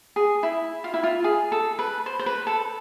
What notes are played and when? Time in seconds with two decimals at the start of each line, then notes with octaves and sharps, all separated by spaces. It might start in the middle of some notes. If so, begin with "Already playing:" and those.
0.16 G#4
0.43 E4
0.84 F4
0.94 E4
1.04 F4
1.24 G#4
1.52 A4
1.79 B4
2.06 C5
2.19 C5
2.26 B4
2.47 A4